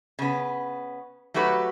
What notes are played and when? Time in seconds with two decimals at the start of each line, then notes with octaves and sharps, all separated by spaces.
0.19 C#3 B3
1.34 F#3 A3 F#4 G4 B4